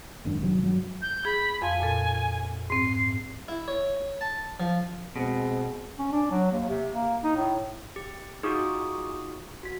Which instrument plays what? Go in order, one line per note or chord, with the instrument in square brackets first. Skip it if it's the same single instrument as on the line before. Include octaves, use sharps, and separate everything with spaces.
[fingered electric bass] F#1 G#2 D#3 D4
C3 D#3 F#3
G2 F#3
[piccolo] G6
[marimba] G#4 [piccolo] B5
[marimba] F2 F5 C6 [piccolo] G#5
[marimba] F2 A#2 A4
[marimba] G#2 C4 [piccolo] C7
[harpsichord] E4
C#5
A5
F3
[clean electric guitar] B2 [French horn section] G#3 C4 G#4
[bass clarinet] C#4
D4
F#3
D#2
C3
A#3
D#4
A2
[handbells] G4
[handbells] D#4 F4 F#4 [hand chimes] G#4 C#6 D#6
[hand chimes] F#4 B6